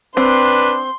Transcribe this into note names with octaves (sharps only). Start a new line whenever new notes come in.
C4 D4 B4 C6